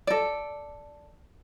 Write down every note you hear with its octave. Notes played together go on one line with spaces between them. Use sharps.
A4 D5